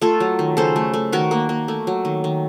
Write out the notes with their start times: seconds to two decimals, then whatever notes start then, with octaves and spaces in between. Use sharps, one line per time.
0.01 A3 F4 A4
0.20 F#3
0.39 D#3
0.57 C#3 A4 C5
0.76 A3
0.94 A3
1.12 D#3 F#4 A#4
1.31 A#3
1.49 A#3
1.68 A3
1.87 F#3
2.05 D#3
2.24 D#3